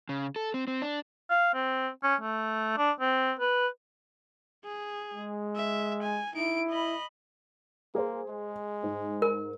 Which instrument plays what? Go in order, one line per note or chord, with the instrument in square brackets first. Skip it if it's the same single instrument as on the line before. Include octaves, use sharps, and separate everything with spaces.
[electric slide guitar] C#3
A4
C4
C4
D4
[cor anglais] F5
C4
C#4
A3
D4
C4
B4
[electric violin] G#4
[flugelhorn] G#3
[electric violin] E5
G#5
[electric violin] D#4 D7 [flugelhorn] E4
[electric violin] D#5 B5
[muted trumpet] A#3 [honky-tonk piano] G#4 C5
[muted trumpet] G#3
[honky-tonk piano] G#2
[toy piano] A#4